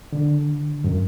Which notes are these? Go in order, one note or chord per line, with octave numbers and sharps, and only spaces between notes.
D3
F#2